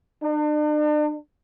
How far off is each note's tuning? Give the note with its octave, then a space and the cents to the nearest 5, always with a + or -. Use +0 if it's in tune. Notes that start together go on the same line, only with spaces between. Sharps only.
D4 +40